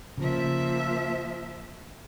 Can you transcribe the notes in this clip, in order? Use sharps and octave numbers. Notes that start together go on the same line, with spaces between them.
C#3 F3 A#3 E5